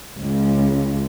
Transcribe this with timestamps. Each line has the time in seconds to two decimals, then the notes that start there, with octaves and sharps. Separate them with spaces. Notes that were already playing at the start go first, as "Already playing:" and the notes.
0.20 C#2